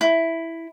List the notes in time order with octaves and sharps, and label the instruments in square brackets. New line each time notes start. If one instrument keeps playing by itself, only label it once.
[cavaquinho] E4